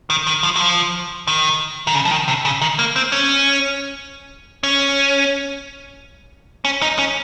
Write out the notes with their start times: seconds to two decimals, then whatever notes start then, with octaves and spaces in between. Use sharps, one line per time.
0.10 D#3
0.27 D#3
0.43 F3
0.56 F#3
0.60 F3
1.27 D#3
1.87 D#3
1.95 C#3
2.05 F3
2.11 D#3
2.28 C3
2.45 C#3
2.61 D#3
2.79 A#3
2.96 C4
3.12 C#4
4.63 C#4
6.65 C#4
6.82 D#4
6.99 C#4